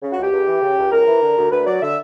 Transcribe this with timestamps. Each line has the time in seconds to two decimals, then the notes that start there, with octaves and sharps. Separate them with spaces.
0.02 C#3
0.12 F#4
0.17 C#2 G4
0.32 C#2
0.47 E3
0.62 C#3
0.77 C#2
0.91 C#2 A#4
1.07 E3
1.22 D3
1.37 D2
1.52 D2 B4
1.67 F#3 D5
1.82 D3 E5